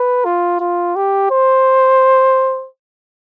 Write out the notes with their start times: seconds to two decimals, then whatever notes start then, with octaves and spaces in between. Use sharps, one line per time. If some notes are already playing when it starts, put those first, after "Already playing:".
Already playing: B4
0.25 F4
0.60 F4
0.96 G4
1.31 C5